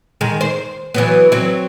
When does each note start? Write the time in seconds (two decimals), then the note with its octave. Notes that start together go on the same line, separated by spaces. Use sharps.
0.21 D#3 G#3
0.41 C5
0.94 E3 F#3 B3
1.32 F#3 C4